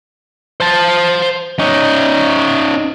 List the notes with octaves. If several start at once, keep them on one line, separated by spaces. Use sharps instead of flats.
C5 A5
C#4 D#4